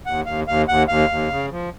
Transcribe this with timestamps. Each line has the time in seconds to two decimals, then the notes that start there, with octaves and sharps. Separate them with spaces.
0.06 D#2 F#5
0.26 D#2 F5
0.47 D#2 F5
0.68 D#2 F#5
0.88 D#2 F5
1.09 D#2
1.30 C#3
1.50 F3